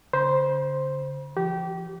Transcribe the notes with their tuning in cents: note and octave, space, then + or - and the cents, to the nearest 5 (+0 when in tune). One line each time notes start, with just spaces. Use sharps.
D3 -45 C5 +0 B5 -45
F3 -40 G4 -25